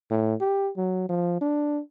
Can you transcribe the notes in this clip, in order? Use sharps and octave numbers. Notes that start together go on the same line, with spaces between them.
A2
G4
F#3
F3
D4